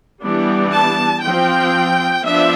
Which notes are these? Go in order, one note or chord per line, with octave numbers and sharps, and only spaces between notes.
E3 G3 B3 D4
A5
F3 C4 G5
F3 B3 D4 E5